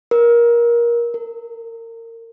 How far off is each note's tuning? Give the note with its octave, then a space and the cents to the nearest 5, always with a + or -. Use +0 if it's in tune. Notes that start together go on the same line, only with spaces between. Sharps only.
A#4 +20
A#4 -30